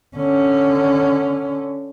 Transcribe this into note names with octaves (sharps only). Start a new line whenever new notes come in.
D3 C#4